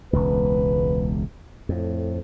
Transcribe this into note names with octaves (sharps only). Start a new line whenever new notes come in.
E1 C#2 B4
F2 A2